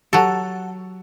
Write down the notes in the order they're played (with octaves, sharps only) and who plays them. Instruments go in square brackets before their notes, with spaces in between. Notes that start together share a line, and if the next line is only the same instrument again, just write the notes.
[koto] F#3 A4 [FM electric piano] G4 F#5 A5